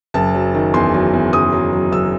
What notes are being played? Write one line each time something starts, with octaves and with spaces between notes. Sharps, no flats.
F#1 A5
F#3
D#3
E2 C6
F#3
E2
F#1 D#6
F#3
F#3
F#1 E6